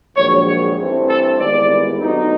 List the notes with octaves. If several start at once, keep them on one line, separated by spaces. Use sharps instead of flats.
A#1 G#2 D#3 F#3 C#5
C#5
G2 E3 A3 C4
A4
G#1 G#2 E3 G3 B3 D5
D2 D3 F#3 B3 D#4